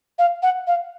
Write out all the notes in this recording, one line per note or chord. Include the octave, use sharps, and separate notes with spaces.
F5
F#5
F5